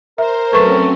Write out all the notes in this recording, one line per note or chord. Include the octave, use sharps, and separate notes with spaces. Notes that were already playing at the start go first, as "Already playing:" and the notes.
A#4 C5 E5
F#3 A3 C4 C#4 B4 C#6